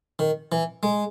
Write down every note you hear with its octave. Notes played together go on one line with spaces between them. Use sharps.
D#3
E3
G#3